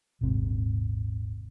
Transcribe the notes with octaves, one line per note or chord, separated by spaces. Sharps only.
D#1 G#1 G#2 C3